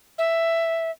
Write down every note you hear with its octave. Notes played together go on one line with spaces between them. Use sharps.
E5